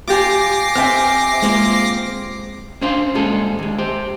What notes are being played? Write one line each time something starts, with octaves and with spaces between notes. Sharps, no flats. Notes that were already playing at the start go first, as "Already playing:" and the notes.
F4 G4 G#5 D6 A#6 C7
C4 E5 G5 G#5 F6
G#3 A#3 C4 F4
C#4 D4 C5 F5 C6
A#2 G3 G#3 G#4 A4
D#2 G#3
G4 C5